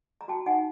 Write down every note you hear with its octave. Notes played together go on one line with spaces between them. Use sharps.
A#5
F#4 G5 A5
D#4 F#5 G#5